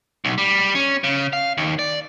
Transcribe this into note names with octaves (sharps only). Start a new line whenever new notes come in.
B1
G3
C#4
C#3
F5
D#2
D5